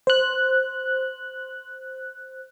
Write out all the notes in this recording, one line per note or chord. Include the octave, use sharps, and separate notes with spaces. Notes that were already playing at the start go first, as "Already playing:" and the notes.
C5 F#6